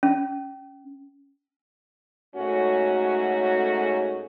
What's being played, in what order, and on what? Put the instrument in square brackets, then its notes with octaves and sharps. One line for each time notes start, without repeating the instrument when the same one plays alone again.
[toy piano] C#4
[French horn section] G#2 F#3 A3 C#4 F#4